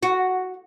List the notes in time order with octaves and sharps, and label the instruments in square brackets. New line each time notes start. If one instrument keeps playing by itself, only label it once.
[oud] F#4